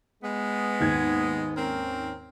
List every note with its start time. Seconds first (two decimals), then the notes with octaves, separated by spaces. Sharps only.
0.23 G#3 B3
0.80 D#2 G#2 G#6
1.57 C4 C#4 A#4